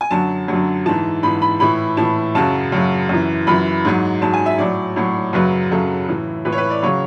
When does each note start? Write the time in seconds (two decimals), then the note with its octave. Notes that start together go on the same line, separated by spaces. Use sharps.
0.01 G#5
0.11 F#2 D3 F#3 A5
0.48 F#2 D3 F#3
0.86 G#2 E3 A5
1.23 G#2 B5
1.27 E3
1.42 B5
1.60 A2 E3 B5
1.97 A2 A5
2.03 E3
2.35 F#2 C#3 F#3 A5
2.72 F#2 C#3 F#3
3.09 F#2 E3
3.47 F#2 E3 B5
3.85 G#2 F#3
4.22 G#2 F#3 A5
4.34 G#5
4.46 E5
4.58 A2 F#3 D5
4.96 A2 F#3
5.33 F#2 C#3 F#3 B4
5.71 F#2 C#3 F#3 A4
6.09 A2 E3
6.45 A2 E3 B4
6.52 C#5
6.58 B4
6.70 D5
6.83 C#3 F#3 C#5